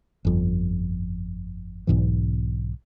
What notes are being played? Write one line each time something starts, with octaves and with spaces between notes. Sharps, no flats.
G1 F2
B1 G#2 B2 E3